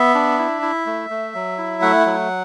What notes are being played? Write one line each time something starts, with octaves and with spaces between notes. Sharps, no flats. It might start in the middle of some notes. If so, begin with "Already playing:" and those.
Already playing: B3 E5
D4
E4
E4
A3
A3
F#3
E4
A3 F#5
F#3